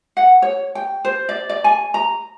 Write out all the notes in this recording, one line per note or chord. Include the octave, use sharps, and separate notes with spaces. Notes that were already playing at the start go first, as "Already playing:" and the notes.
F#5
C#5
G5
C5
D5
D5
G#5
A#5